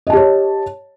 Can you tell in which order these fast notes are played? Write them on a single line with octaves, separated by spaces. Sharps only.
D#5 A5 G4 C#5